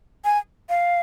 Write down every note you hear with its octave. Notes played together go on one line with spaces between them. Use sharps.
G#5
F5